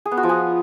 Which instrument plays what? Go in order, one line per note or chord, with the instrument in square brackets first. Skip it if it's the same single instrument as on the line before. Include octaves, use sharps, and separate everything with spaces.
[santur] G#4
B3
F#4
F3
G#4